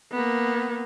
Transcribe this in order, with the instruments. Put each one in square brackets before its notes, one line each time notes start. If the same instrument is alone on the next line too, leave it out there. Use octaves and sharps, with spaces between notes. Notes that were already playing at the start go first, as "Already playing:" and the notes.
[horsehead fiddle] A#3 B3